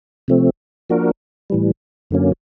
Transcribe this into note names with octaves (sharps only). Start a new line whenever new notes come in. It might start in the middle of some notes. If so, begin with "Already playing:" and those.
C3 F3 A3 C4
F3 A#3 D4 F#4 A#4
A2 E3 G3
F#2 D3 F#3 A#3 C#4